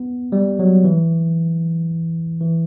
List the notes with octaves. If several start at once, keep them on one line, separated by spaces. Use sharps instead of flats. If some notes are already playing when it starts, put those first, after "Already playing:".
Already playing: B3
G3
F#3
E3
E3